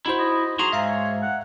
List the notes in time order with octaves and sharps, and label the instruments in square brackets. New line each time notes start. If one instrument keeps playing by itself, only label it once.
[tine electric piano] D#4 F#4 C5 [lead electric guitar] E4
[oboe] D#5
[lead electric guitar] F#4 A#5 [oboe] G#4 [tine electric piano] C6
[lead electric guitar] G#2 [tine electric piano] E5 F5 A#5
[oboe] C#5
F#5